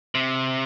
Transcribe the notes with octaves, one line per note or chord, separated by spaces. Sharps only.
C3